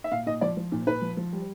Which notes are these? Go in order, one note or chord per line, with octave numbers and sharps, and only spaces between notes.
E5
A#2 F5
A#2 D#5
F3 D5
F3
A#2
A#2 B4
F3
F3
G3